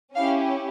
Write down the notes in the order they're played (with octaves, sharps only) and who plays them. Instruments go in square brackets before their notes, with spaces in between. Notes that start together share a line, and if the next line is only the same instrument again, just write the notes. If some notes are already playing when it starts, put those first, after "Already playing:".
[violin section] C#4 E4 G4 F5